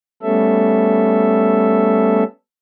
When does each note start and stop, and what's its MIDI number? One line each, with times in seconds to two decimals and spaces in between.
0.23 2.24 55
0.23 2.24 57
0.23 2.24 59
0.23 2.24 61
0.23 2.24 69
0.23 2.24 76